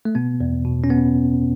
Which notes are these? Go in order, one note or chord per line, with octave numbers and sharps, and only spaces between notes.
A3
B2 B3
E2
B2
C#4
B2 B3